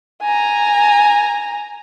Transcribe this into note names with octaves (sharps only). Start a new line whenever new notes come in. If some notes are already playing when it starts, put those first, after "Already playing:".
G#5 A#5